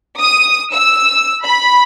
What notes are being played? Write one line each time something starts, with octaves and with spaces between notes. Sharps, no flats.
D#6
E6
B5